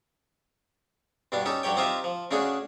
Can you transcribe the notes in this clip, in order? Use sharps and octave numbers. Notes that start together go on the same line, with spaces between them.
G2 B2 G3 D4
C#4 D#4 G4 A4
G2 F#3 G4 C#5 G5
C4 D#4 F4 G4 E5 F5
F3
C#3 A3 C#4 D4 F#4 G#4